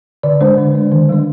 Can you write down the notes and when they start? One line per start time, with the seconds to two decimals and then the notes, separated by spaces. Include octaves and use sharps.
0.23 D3 D5
0.41 G#3 D4 C5
0.58 D3
0.75 G#3 D4
0.92 D#3
1.09 G3 D4